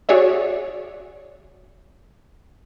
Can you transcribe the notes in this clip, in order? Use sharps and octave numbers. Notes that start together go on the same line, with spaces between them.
F#4 G#4 C#5 D5 E5